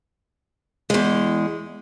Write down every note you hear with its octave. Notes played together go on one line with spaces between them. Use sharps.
E2 G#3